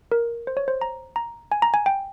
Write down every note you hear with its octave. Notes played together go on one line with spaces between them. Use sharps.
A#4
C5
C#5
C5
A#5
A#5
G#5
A#5
G#5
G5